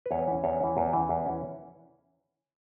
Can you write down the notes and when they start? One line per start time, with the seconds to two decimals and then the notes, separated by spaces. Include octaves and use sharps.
0.06 B4
0.11 E2 C#5
0.28 E3 C#4
0.44 E2 C#5
0.60 E3 C#4
0.77 E2
0.93 E3 C#4
1.09 E2
1.26 E3 C#4